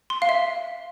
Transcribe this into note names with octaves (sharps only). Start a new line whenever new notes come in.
C6
F5
E5